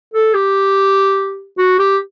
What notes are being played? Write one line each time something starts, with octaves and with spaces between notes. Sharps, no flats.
A4
G4
F#4
G4